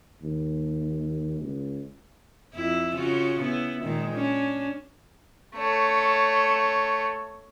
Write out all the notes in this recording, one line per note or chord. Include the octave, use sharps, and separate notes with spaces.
D#2
C#2
F2 E4
C#3 F4 F#4
B3 E4
A#2 D#3 G#3
C#4 D4
A3 C#5